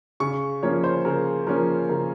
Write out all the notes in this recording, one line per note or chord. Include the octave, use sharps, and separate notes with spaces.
C#3 C#6
F3 A#3 C#4 C#5
C5
C#3 A#4
F3 A#3 C#4 A#4
C#3 A#4